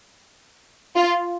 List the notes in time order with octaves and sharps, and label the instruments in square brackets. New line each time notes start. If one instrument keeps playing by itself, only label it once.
[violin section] F4